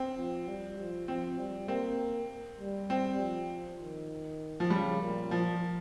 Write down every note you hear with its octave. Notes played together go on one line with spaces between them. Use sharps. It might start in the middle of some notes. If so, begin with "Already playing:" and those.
Already playing: C4
F3
G3
F3
F3 C4
G3
A#3 C4
G3
C4
F3
D#3
F3
C#3 G3
A#2
F3